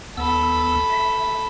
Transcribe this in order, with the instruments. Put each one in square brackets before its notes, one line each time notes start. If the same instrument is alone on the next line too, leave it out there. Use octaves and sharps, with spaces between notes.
[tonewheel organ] D#2 B3 E6 [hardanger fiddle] A4 B5
[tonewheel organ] E5